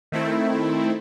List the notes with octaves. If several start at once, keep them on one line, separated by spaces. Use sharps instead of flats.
D#3 A3 C4 E4